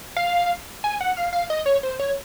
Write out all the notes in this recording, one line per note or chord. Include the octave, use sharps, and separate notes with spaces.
F5
G#5
F#5
F5
F5
D#5
C#5
C5
C#5